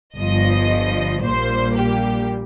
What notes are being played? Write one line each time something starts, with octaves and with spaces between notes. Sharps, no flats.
G1 G2 F3 D#5
A#1 A#2 G3 A#3 C5
G4